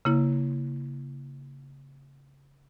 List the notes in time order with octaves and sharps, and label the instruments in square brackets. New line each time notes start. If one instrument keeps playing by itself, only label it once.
[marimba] C#3 A#3 E4